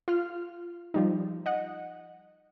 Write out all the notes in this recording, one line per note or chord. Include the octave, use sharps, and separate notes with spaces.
F4 F6
F3 G3 D#4
D#5 F#5